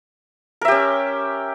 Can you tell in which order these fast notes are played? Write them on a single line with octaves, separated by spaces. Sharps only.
A#4 E5 G4 C#4